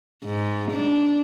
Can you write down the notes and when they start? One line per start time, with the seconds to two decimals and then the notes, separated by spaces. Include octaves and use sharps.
0.25 G#2
0.71 D4